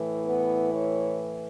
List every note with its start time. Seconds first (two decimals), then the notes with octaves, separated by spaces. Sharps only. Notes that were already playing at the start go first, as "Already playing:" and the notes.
Already playing: A2 E3
0.27 B3
0.73 C#5